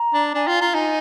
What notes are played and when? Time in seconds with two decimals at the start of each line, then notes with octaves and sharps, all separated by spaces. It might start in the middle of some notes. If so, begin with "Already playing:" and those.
Already playing: A#5
0.14 D4
0.34 D4 G#5
0.47 F4 G5
0.56 G#5
0.61 F4 A#5
0.74 D#4 G#5